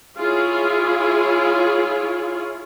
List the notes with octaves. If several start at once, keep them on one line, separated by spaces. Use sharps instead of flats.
E4 F4 G#4 C#5